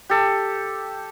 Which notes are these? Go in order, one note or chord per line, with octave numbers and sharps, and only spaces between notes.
G4 A4